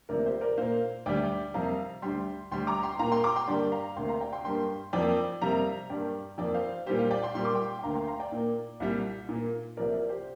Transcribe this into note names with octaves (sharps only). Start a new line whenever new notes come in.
D2 C3 F3 A#3 A#4 D5
G4 C5
A#4 D5
A#2 A#3 C5 F5
D2 D3 G3 D5 G5
F2 C3 G3 A#3 F5 A#5
D2 D3 G3 G5 C6
D2 D3 G3 G5 C6
A#5 D6
G5 C6
A#2 A#3 F5 A#5
G5 C6
A#5 D6
G5 C6
G2 D3 G3 A#3 D5 G5
F5 A#5
D2 C3 A#3 G5 C6
F5 A#5
D5 G5
G5 C6
G2 G3 A#3 G5 C6
F2 F3 A#3 D5 G5
F2 C3 G3 A#3 F5 A#5
G2 G3 A#3 D5 G5
F2 F3 A#3 D5 G5
C5 F5
A#2 G3 A#3 G4 C5
F4
D5 G5
G5 C6
A#2 G3 A#3 C6
D6
G5 C6
G5
D2 D3 A#3 F5 A#5
G5 C6
F5 A#5
D5 G5
A#2 A#3
C2 A#2 G3
A#2 A#3
C2 C3 F3 A#3 A#4 D5
A#4 D5
G4 C5